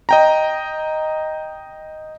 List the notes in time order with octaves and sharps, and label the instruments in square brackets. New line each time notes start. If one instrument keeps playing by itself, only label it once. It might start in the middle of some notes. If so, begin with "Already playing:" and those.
[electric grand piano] D#5 G5 A#5